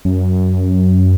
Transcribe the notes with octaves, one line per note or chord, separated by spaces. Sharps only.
F#2